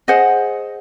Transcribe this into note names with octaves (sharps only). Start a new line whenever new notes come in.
G#4 C5 D#5 F#5